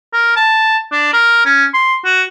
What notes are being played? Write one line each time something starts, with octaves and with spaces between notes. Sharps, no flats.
A#4
A5
D4
A#4
C#4
C6
F#4